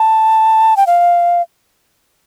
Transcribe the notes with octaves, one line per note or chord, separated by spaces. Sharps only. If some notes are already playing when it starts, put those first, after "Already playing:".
Already playing: A5
G5
F5